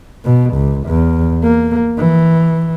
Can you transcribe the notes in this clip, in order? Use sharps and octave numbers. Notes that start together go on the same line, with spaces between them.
B2
C#2
E2
A#3
E3